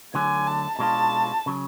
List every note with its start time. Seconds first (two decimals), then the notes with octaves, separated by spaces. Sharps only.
0.14 D2 D3 F#3 G#5
0.47 A5
0.79 B2 G#3 D4 F4 A5
1.46 C#3 F#3